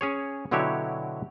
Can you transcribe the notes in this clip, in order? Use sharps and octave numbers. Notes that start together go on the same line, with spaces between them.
C#4 G#4 C#5
B2 D3 F#3 E4 G4 C#5